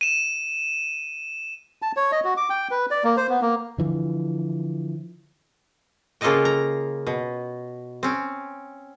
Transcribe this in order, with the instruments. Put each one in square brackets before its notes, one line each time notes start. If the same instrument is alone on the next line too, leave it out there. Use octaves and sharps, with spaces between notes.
[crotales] D#7 E7
[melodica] A5
C#5
D#5
F#4
D6
G5
B4
D5
A#3
C5
B3
A#3
[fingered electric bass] D3 E3 F3
[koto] C#3 A#3 F4 A4 D#5 G5
A#5
B2
C4 C#4